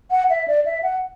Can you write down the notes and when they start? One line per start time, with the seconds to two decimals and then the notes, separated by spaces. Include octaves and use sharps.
0.11 F#5
0.30 E5
0.48 D5
0.65 E5
0.83 F#5